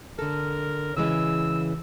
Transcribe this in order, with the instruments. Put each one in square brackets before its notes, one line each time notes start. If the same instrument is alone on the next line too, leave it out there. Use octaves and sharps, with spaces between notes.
[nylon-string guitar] D3 A4 [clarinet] A#4
[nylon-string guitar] C#3 E3 G#3 [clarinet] E6